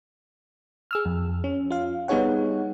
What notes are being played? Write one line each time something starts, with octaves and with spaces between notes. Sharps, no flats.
G#4 E6 F6
F2
C#4
F4 F5
G3 B3 D#4 G#4 C#5 F#5